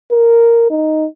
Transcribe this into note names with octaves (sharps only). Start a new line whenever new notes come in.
A#4
D#4